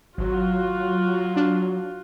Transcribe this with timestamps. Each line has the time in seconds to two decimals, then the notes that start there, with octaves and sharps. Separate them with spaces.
0.18 G#1 F#3 F4 F#4
1.37 D4